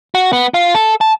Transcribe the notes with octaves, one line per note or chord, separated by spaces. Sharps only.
F#4
B3
F4
A4
A5